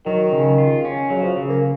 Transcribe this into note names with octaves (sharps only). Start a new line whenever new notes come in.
D#3 F#3
C#3
F4
C#4
C#3 F#3
F3
C#3
A#3